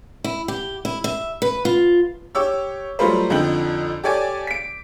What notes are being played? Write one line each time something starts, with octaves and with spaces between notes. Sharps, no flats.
E4
G4
E4
E5
B4
F4
G4 C#5 D6 E6
F#3 G3 A3 F4 B4 C5
F2 D3 F3 D#4 G5 F#7
G4 A4 C#5 D5 G#5 D6
B6 D7